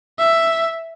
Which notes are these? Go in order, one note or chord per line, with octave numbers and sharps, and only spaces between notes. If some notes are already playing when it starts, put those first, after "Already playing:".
E5